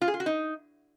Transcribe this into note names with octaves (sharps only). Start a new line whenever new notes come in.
F4
G#4
F4
F#4
D#4